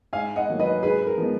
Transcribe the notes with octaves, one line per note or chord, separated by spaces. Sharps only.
G#2 F5 G#5
D#5 F#5
D#3 F#3 A#3
B4 D#5
G#2 G#4 B4
A#4
F3 G#3 B3 D#4